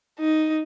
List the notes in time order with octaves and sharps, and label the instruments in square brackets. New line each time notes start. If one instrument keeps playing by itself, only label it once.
[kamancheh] D#4